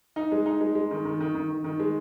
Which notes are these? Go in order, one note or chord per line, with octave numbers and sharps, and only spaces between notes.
D#4
G#3
D#4
G#3
G#3
D#3
D#3
D#3
D#3
D#3
D#3
G#3